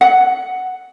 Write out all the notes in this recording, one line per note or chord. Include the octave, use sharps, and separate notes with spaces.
F#5